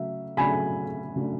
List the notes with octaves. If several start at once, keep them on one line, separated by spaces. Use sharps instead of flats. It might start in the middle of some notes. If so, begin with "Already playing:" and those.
Already playing: C#3 F#3 A3 E5
C#3 F#3 A3 D4 G#5 B5
C#3 F#3 A3 D4